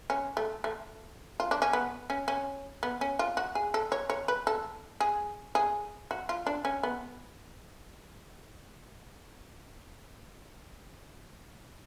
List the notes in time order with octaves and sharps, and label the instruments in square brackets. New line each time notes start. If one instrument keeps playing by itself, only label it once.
[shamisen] C#4
A3
A3
F4
D4
C#4
B3
C#4
C#4
B3
C#4
F4
F#4
G#4
A4
C#5
C#5
B4
A4
G#4
G#4
F#4
F4
D4
C#4
B3